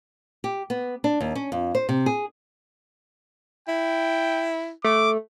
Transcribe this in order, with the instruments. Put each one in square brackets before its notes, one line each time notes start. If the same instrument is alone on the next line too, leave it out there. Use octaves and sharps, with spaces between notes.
[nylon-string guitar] G4
B3
D4
D#2
C#4
F2
C5
C3
G#4
[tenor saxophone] E4 [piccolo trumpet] G5
[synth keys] A3 [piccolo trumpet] D6